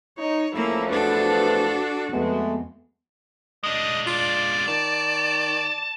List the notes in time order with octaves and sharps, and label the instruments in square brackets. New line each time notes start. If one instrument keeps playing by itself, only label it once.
[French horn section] D#4 [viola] C#5
[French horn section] E2 F3 A3 [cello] A#3 [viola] C#4 E4
[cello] D4 A4 [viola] F#4 [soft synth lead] B4
[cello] F2 [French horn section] G#3 A3 [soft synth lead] B3
[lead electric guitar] G#3 D4 [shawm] D#5
[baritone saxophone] F4 [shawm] D5
[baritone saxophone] D#3 [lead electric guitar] A5